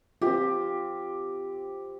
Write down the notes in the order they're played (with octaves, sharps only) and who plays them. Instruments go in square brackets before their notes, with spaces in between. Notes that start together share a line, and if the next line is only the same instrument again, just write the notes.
[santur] C4 G4 [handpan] F4